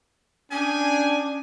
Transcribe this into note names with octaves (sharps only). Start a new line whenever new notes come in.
C#4 D4 G#4 G5 G#5